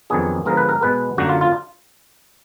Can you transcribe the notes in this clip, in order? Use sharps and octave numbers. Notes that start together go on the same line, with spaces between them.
F2 D#3 F#3 B3 D4 G#4
D3 F3 G#3 B3 D#4 A#4
B4
A#4
B2 G#3 B3 B4
F#2 D3 F#3 A#3 F#4
F4
F4